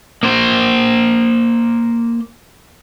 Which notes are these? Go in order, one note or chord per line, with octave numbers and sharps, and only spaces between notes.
A#3 C5